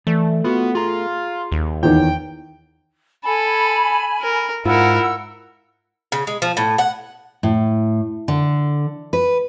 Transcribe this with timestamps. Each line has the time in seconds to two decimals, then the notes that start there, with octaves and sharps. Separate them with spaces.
0.07 E3 A3 D5
0.44 B3 F4 F#4
0.75 F4 G#4 A#5
1.52 D#2
1.83 E2 D#3 B3 C#5 G5
3.25 A4 G#5 B5
4.22 A#4
4.65 G#2 E4 F4 A#4 F#5 E6
6.12 C#3
6.27 G#3
6.42 F3
6.57 A2
6.78 F#5
7.43 A2
8.28 D3
9.13 B4